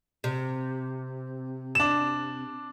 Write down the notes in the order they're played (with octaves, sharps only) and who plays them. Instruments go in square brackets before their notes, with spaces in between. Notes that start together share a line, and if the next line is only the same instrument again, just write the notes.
[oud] C3
[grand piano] D4 E7